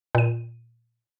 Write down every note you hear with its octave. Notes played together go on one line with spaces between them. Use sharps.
A#2 D#7